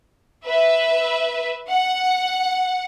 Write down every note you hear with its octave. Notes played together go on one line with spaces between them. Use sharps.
B4 E5
F#5